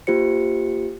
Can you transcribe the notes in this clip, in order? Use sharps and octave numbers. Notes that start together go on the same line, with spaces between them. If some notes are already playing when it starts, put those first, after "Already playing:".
A#3 F4 G4 C5 C#7